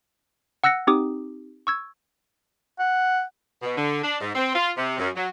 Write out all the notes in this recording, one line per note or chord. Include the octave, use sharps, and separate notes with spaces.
F#5 E6 F#6 A#6 C#7
C4 D#4 G4 D6 D#6
C#6 E6 G#6
F#5
B2
D3
D4
G#2
C4
F4
C3
F#2
F#3